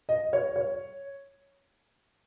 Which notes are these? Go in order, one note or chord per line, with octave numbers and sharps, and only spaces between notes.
D#5
C#5
C#5